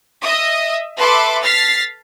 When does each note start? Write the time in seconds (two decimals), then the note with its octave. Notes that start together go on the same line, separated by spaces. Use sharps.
0.21 D#5 E5 D#6
0.97 A4 B4 E5 B5 C6 D6
1.42 F6 A6 B6 C7